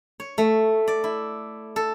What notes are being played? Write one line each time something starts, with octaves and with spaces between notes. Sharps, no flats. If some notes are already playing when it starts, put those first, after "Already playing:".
C#5
A3
D5
E4
A4